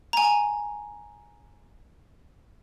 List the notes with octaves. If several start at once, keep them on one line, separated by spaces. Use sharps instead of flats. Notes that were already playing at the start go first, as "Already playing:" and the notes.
G#5 A#5